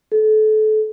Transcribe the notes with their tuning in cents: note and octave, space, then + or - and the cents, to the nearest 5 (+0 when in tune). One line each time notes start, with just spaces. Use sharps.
A4 -30